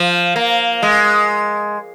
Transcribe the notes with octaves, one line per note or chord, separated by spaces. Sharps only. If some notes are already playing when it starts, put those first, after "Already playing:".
Already playing: F3
A#3
G#3